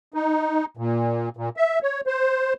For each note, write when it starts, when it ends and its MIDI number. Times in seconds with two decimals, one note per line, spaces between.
0.14 0.65 63
0.77 1.29 46
1.37 1.49 46
1.57 1.79 76
1.83 2.01 73
2.07 2.54 72